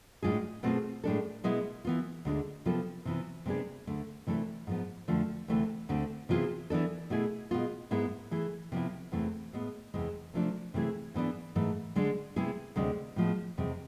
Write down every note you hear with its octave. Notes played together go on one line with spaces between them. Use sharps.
A2 G#3 D4 F4 G#4
B2 A3 C4 F4 G#4
A2 G#3 D4 A4
B2 G#3 B3 E4
E3 B3 F4
D2 D3 G#3 D4
C3 F3 B3 F4 A4
C3 E3 B3 F4
C3 G#3 B3 D4 G#4
D2 D3 A3
C3 E3 A3 D4 A4
G#2 F3 B3
F2 D3 F3 A3
D2 C3 E3 A3
D2 D3 A3 C4
C3 E3 B3 F4 G#4
E3 B3 D4 A4
B2 A3 E4 G#4
B2 G#3 B3 F4
G#2 G#3 B3 E4
E3 A3 E4 G#4
C3 F3 B3 E4
E2 C3 E3 A3 C4
A2 G#3 B3
E2 C3 E3 G#3
C3 F3 A3 D4
C3 E3 A3 E4 G#4
G#2 E3 B3 D4
G#2 E3 A3
D3 G#3 D4
C3 G#3 B3 E4 G#4
D2 C3 G#3 D4
A2 F3 G#3 B3
E2 C3 G#3